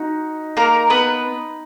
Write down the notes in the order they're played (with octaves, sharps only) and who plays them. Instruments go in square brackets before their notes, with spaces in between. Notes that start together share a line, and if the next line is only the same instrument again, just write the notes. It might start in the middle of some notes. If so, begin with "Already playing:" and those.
Already playing: [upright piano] D#4 [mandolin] F#4
[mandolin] A#3 A#4
B3 B4